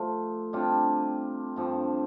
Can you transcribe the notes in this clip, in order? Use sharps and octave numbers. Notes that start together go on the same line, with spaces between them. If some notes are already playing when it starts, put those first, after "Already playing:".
Already playing: F3 A3 F4
C3 G3 D4 F4
G2 F3 C4